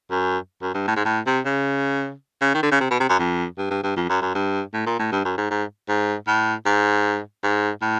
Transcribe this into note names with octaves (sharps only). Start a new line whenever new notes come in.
F#2
F#2
G2
A2
G#2
A2
C3
C#3
C#3
D#3
D3
C#3
C3
B2
C3
F#2
F2
G2
G2
G2
F2
F#2
F#2
G2
A2
A#2
A2
G2
F#2
G#2
G#2
G#2
A2
G#2
G#2
A2